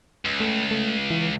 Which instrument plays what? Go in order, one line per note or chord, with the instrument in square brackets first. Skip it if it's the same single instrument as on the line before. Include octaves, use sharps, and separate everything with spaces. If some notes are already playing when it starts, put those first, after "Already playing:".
[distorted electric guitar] C#2
[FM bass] A3
A3
E3